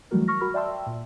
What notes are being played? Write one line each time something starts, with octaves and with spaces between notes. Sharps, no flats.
E3 F#3 G3 A3 F#4 A#4
C#6 F6 A#6
F#4 A#4 B5 F6
D5 E5 G5 A5 C6 E6
A#2